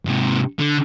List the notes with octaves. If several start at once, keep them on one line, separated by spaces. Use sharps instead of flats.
G#2 C3
D3